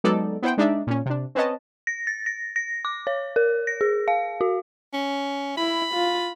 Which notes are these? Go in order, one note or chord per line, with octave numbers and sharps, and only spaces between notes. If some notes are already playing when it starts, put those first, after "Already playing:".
F#3 G#3 B3 D#4 A4 D5
B3 E4 C5 F#5 G5
G#3 D4 D#4 D5 E5
A#2 C#4
C3 D4
C4 C#4 B4 C#5 D#5 A5
A#6
A6
A#6
A#6
D6
C#5
A#4
A#6
G#4
F5
F#4
C#4
E4 B5
F4